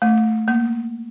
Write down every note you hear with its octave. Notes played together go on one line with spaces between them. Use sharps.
A3
A#3